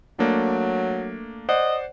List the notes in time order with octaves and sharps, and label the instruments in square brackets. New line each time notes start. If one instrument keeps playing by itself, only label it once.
[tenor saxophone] F#3 [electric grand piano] A3 A#3 D4
[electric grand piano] C5 D5 F#5 [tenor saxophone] D#5